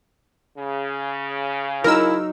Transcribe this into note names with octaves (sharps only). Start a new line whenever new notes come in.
C#3
F#3 D#4 E4 A#4 E6